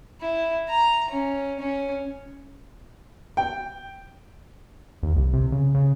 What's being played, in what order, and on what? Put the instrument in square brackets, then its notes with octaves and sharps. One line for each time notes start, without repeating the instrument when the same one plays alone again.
[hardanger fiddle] E4
A#5
C#4
C#4
[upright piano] G5
[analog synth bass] D#2
C2
C3
C#3
C#3